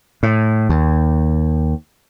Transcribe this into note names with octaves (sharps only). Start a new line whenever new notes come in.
A2
D#2